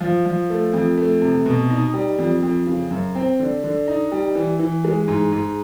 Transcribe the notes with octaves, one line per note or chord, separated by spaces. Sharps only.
F3
F3
A3
F2
A3
C3
B2
D#4
G3
F2
F2
C#3
F#2
C4
D3
D3
D#4
G3
E3
E3
G#3
G#2
G#2